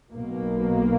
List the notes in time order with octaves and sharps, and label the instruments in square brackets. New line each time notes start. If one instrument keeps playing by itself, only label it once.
[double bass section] B1 B2 A#3